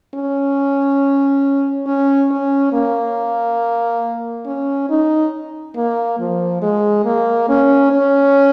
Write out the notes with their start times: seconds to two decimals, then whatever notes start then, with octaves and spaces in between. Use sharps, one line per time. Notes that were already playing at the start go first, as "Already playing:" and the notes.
0.15 C#4
1.87 C#4
2.31 C#4
2.73 A#3
4.46 C#4
4.90 D#4
5.76 A#3
6.20 F3
6.62 G#3
7.05 A#3
7.49 C#4
7.92 C#4